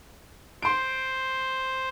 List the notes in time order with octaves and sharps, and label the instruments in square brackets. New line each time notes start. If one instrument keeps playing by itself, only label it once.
[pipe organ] C5 [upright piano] C6 D7